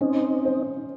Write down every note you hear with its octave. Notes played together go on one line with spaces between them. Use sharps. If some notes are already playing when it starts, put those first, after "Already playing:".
C4 C#4 D#4
C5